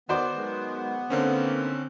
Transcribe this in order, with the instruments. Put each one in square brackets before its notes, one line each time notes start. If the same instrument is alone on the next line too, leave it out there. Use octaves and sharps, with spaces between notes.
[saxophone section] D#3 [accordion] B3 [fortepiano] F#4 C5 D5
[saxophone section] D#3 F#3 G#3
[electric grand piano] D3 C4 C#4 [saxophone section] D#3 A#3